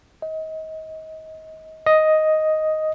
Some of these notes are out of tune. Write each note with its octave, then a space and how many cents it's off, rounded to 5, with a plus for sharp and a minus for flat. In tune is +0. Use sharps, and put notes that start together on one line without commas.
D#5 +30
D#5 +5